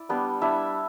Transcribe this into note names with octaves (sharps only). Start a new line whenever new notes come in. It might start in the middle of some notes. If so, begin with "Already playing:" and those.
Already playing: E4 D5
G3 B3 D4
G3 D4 E4 E5